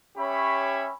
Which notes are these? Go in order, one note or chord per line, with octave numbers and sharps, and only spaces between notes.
C#4 G4 C#5 E5 B5